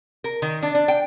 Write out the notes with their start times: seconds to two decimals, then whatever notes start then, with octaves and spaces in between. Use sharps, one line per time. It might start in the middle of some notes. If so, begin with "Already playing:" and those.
0.24 A#4
0.42 D#3
0.62 D4
0.75 D4
0.88 G5